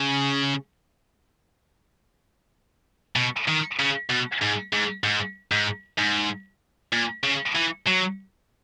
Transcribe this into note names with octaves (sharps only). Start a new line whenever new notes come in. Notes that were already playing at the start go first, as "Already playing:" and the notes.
Already playing: C#3
B2
D#3
C#3
B2
G#2
G#2
G#2
G#2
G#2
A#2
C#3
E3
F#3